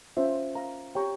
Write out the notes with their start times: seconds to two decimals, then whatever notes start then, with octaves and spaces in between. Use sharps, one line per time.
0.17 C#4 F4 C5 E5
0.55 A#4 F5 A#5
0.95 G4 C#5 G5 A#5 C#6